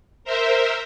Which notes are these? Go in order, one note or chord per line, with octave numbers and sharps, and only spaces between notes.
A#4 C5 E5